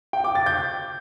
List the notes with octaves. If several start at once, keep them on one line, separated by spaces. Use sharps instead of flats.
G5
D6
A6
G6